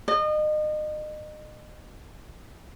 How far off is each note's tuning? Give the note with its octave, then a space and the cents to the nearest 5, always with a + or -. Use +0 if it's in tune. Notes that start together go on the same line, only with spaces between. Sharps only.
D#5 -35